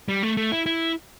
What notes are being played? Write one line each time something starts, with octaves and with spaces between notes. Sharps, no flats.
G3
A3
A3
E4
E4